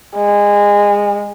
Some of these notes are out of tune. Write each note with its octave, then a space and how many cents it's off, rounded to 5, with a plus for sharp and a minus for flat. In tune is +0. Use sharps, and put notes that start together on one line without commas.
G#3 -25